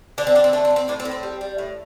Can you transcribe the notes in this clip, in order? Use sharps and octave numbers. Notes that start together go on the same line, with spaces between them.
D3 D4
C4
D3 D4
C4
A3 D4
C4
A3
C4
A2 D4
C4
A2
C4
G3
G3
A2